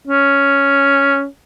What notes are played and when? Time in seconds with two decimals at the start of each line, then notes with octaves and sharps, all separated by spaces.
0.07 C#4